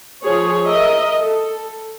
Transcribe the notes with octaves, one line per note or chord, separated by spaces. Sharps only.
F3 G#4 C#5
A#4 D#5 E5
A4